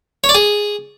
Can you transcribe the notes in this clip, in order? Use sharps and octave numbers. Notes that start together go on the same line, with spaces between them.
C#5
D5
G#4